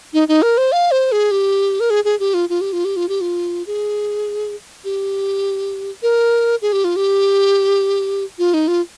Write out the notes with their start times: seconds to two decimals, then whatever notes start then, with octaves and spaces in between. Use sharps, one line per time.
0.13 D#4
0.28 D#4
0.42 A#4
0.58 C5
0.72 F5
0.91 C5
1.12 G#4
1.31 G4
1.80 A#4
1.90 G#4
2.05 G#4
2.20 G4
2.34 F4
2.49 F4
2.61 G4
2.73 F4
2.85 G4
2.96 F4
3.09 G4
3.21 F4
3.67 G#4
4.85 G4
6.03 A#4
6.62 G#4
6.73 G4
6.84 F4
6.96 G4
8.39 F4
8.54 D#4
8.68 F4